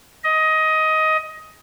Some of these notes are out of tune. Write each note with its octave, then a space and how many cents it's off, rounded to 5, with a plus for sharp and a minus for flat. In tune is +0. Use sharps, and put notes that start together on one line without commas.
D#5 +15